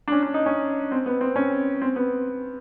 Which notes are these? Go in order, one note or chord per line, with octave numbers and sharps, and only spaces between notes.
D4
C#4
D4
D#4
C#4
C4
B3
C4
C#4
C4
B3